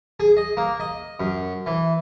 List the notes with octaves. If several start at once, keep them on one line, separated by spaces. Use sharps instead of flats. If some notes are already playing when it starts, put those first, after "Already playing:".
G#4
D#5
A#3
D#5
F#2
E3